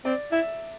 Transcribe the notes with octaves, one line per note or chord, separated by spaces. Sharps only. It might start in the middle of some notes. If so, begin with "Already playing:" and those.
C4 D5
E4 E5